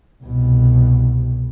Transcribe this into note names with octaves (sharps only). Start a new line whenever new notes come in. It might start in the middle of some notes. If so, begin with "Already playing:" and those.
C2 B2